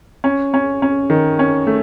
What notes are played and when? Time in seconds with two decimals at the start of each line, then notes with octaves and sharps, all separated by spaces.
0.24 C#4
0.54 C#4
0.82 C#4
1.10 D#3
1.39 C#4
1.67 A3